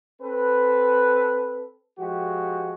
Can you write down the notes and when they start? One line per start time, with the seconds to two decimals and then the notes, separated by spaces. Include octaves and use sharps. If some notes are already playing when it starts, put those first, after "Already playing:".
0.22 C4 A4 B4
1.98 F3 G#3 F#4 G4